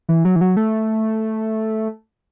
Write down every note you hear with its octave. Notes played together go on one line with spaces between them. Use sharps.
E3
F#3
E3
F#3
A3